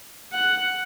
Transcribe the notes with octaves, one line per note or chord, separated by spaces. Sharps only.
F#5